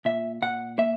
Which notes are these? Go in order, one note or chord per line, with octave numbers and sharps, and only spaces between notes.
A#2 E5
A#2 F#5
A#3 E5